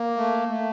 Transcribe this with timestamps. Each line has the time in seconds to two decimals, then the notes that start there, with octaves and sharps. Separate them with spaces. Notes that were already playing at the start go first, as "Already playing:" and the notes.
Already playing: A#3
0.17 A3
0.49 A3